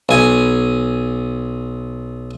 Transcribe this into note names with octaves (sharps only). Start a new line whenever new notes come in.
B1 G#5